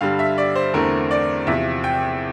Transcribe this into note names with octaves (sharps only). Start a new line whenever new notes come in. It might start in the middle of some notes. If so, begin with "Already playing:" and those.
G2 D3 G3 F5
E5
D5
C5
E2 D3 A3 C4 A#4
D5
E2 C3 F3 E5
G5